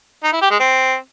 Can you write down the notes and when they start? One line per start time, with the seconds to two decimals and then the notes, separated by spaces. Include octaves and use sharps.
0.23 D#4
0.33 E4
0.42 G4
0.51 G#3
0.60 C4